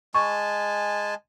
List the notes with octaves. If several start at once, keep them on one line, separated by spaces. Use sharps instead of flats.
G#3 G#5 A5 C#6